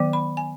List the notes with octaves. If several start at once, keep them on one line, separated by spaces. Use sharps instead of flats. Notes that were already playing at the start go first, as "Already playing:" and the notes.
Already playing: D#3 F#3 B3
B5
G#5